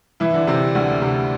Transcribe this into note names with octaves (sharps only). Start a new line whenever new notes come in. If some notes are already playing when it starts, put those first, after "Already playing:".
E3 E4
D3 D4
C3 C4
D2 D3
C3